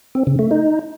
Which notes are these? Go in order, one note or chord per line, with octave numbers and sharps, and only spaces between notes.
C4
C#3
A3
D#4